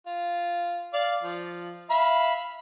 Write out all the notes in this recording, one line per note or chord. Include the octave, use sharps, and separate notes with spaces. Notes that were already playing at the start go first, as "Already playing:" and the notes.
F4
D5 F5
F3
E5 F5 B5